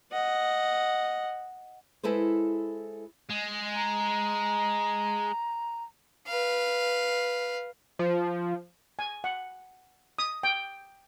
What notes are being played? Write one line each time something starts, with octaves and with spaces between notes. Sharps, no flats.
D#5 F#5
G#3 E4 A4 B4 C5
G#3
A#5
B4 F5
F3
G#5
F#5
D#6
G5